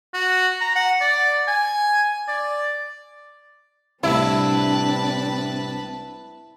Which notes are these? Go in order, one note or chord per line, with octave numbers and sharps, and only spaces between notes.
F#4
A#5
F#5
D5
G#5
D5
C2 A2 C4 D4 E4 B4 A5